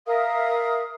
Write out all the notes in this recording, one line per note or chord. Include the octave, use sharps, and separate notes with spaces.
A#4 E5 F5 D#6